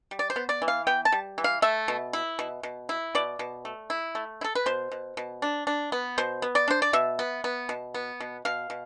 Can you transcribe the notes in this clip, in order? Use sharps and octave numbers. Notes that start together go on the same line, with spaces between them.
G3
D5
C5
B3
D5
E3
F5
B3 G5
A5
G3
E3
F5
A3 E5
B2
E4
B2
B2
E4
B2 D5
B2
A3
E4
A3
E4
A4
B4
B2 C5
B2
B2
D4
D4
B3
B2 C5
B3
D5
D4 C5
D5
B2 E5
B3
B3
B2
B3
B2
B2 F5
B2